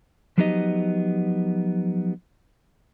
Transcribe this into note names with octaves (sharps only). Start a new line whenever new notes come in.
F3 F#3 B3 D#4 G4 D#5